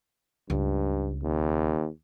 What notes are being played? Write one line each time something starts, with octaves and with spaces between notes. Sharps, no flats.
C#2 G2
D#2